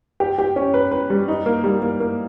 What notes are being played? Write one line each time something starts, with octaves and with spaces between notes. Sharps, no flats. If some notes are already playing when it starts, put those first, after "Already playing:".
G4
G4
C#4
B4
B4
G3
D#4
A#3
G3
A#3
A#3